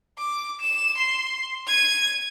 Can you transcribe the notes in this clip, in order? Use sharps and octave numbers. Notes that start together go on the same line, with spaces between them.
D6
E7
C6
G#6 D#7